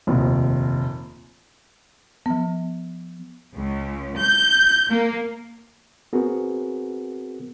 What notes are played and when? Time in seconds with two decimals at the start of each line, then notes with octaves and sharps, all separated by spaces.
0.07 F1 A#1 D#2
2.26 F3 B3
3.56 C#2
4.20 G6
4.90 A#3
6.13 B3 C4 F#4 G#4 A#4